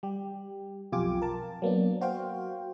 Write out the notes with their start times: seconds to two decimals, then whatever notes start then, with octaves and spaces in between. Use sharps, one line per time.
0.03 G3 G4
0.92 B1 F2 F4 G4 G#5 D6
1.22 A#4 A5
1.62 F#3 A#3 B3 D4
2.01 F#4 C5 F5 G5